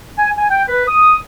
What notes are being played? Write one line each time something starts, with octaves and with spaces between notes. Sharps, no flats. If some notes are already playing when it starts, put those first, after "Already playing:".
G#5
G#5
G5
B4
D#6